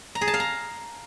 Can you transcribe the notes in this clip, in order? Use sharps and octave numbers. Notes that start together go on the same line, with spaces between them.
A#5
G#4
A5
F5
A#5